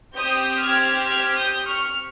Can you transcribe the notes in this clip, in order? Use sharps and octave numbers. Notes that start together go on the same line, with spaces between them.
C4 G4 D#6 G6
F6 G#6
F6 G#6
D#6 G6
C#6 F6